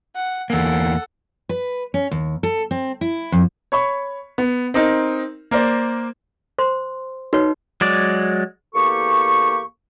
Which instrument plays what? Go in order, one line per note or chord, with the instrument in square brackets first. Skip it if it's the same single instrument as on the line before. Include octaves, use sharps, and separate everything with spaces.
[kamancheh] F#5
[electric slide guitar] E2 A#3 [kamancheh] A4 F#5
[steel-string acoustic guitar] B4
C#4
D#2
A4
C4
E4
F2
[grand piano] C#5 B5 C#6
B3
C4 D#4 A#4
A#3 A#4 C5 D5
[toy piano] C5 C6
[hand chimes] D#4 [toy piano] F#4 B4 C#5
[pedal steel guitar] F#3 G#3 D5
[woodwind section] E2 A#3 G4 A4 C#6